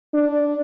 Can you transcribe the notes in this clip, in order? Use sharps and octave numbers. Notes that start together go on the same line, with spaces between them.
D4